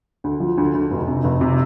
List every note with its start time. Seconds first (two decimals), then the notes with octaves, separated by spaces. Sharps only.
0.24 D2
0.40 F3
0.57 D2
0.74 D2
0.91 F1
1.08 C3
1.24 F1
1.41 C3